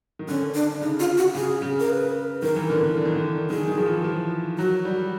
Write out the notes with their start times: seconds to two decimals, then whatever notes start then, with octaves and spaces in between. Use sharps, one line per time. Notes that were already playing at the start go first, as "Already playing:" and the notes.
0.19 D#3
0.28 D3 C#4
0.54 D4
0.81 C#3 D#4
0.99 F4
1.17 F#4
1.35 C#3 G#4
1.62 C#3
1.80 A#4
1.89 B4
2.42 D#3 A#4
2.56 E3
2.70 D3
2.83 D3
2.97 D3
3.05 D#3
3.16 D3
3.50 D#3 G#4
3.68 D#3
3.78 F3
3.86 E3
4.04 F3
4.58 F#3 F#4
4.85 G3